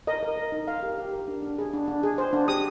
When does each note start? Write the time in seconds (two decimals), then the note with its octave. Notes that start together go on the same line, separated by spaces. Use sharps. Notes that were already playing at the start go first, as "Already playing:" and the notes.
0.07 A#4 D#5
0.23 A#4
0.38 A#4
0.52 D#4
0.68 A#4 F5
0.83 G4
0.98 G4
1.13 A#4
1.28 D4
1.42 D4
1.59 G#4
1.73 D4
1.88 D4
2.03 G#4
2.18 C5
2.33 D4
2.48 G4 D#6